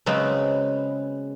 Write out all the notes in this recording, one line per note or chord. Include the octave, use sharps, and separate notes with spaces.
C#3 F#3 G#3 B3 C4